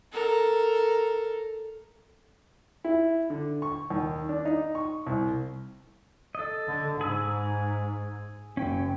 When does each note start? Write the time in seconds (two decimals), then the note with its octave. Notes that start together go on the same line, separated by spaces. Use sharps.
0.12 A4 A#4
2.84 E4
3.30 D3
3.62 C#6
3.90 D#2
4.29 D4
4.45 D#4
4.75 C#6
5.06 C2
6.35 A4 D#5
6.67 D3
7.01 G#2 G#4 B5 E6
8.57 F#1 C#4 G5